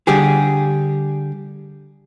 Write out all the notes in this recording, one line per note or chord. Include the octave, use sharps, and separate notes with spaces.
D3 G3 G4 G#4